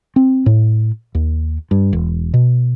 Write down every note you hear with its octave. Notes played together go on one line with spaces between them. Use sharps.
C4
A2
D#2
G2
E1
B2